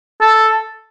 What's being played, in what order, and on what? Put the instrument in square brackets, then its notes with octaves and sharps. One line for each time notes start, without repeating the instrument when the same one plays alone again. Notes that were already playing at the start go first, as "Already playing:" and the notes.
[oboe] A4